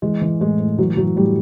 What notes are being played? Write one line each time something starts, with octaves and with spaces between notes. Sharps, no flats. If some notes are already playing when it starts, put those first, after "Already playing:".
E3 G#3
E3
A2 G#3
A2
E3 F#3
E3 F#3
A2 G3